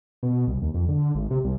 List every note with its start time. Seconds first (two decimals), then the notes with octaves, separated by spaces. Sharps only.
0.23 B2
0.48 C2
0.62 D#2
0.74 F2
0.88 D3
1.15 G#1
1.30 C3
1.44 C2